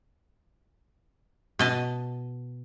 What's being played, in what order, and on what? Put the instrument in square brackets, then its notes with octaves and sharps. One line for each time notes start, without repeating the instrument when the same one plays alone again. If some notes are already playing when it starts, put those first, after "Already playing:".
[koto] B2 D#5 A5